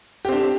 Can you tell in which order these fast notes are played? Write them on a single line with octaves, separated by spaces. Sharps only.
G4 C4 D4